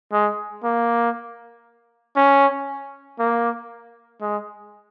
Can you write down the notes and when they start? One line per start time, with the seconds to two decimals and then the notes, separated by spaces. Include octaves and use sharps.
0.12 G#3
0.64 A#3
2.17 C#4
3.20 A#3
4.22 G#3